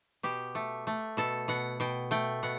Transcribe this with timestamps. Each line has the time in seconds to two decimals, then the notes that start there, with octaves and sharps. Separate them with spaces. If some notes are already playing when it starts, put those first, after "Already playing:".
0.23 B2 G4
0.55 A3
0.87 A3
1.17 B2 A4
1.48 B2 F#5
1.80 B2 G5
2.11 A3 G5
2.43 B2 F#5